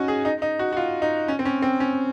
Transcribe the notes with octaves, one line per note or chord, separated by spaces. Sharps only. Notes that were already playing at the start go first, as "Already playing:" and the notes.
Already playing: C#4 D#4 F#4
G#4
D#4
D#4
F#4
F#4
F4
D#4
C#4
C4
C#4
C4
C#4